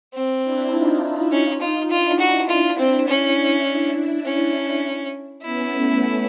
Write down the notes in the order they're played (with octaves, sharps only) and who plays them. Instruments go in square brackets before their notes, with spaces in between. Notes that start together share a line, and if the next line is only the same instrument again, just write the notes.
[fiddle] C4
[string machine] D4 E4
D#4 F4
[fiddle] C#4
F4
[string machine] D4 E4 [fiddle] F4
[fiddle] F#4
F4
C4
[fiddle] C#4 [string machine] D4 E4
[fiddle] C#4
[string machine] B3 C#4 [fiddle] E4
[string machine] A3 B3